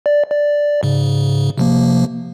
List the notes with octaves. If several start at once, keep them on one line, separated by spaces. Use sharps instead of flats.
D5
D5
G#2 C#3
C3 F3 A#3